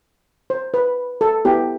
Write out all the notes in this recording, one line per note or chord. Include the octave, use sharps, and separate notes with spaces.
C5
B4
A4
B3 E4 G4